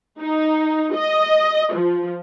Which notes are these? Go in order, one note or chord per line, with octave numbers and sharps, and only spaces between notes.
D#4
D#5
F3